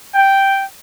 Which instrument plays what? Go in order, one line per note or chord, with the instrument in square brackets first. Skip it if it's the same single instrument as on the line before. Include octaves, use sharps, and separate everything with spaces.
[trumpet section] G5